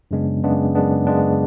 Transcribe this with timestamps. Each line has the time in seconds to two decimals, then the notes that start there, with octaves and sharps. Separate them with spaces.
0.11 F#2 C#3 G#3 B3 D4
0.43 F#2 C#3 G#3 B3 D4
0.75 F#2 C#3 G#3 B3 D4
1.07 F#2 C#3 G#3 B3 D4